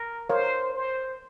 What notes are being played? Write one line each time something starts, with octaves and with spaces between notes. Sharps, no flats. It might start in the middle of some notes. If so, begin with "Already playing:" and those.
Already playing: A#4
A#4 C5 C#5 F5
C5